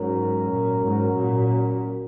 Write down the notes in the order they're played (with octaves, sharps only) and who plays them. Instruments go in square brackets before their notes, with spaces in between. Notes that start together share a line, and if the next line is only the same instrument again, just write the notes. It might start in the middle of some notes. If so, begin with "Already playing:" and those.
Already playing: [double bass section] G#2 [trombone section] F#3 C#4 F#4 A#4
[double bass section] A#2
G#2
A#2